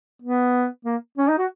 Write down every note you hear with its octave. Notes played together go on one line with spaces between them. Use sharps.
B3
A#3
C#4
D#4
F#4